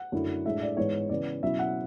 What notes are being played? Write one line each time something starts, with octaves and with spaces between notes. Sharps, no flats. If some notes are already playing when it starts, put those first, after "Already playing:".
Already playing: F#5
F#2 D3 A3 E4
A2 G#3 D4 E5
D5
G#2 E3 G#3 B3 C#5
C#3 E3 B3 D5
B2 F#3 C#4 E4 E5
F#5